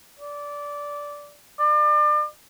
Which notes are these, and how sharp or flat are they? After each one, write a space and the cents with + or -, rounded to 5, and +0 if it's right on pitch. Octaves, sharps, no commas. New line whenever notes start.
D5 -15
D5 +35